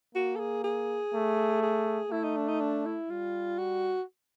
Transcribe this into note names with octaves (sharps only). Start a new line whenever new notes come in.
A#3 F#4
A4
G#4
G#4
A3
G#4
A3 E4
D#4
D4
D#4
D4
E4
G3 F4
F#4